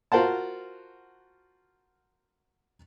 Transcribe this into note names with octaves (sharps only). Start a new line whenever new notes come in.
F4 F#4 A#4 C5 F#5 A5